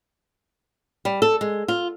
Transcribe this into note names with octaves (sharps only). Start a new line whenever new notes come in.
G3
A4
G#3
F4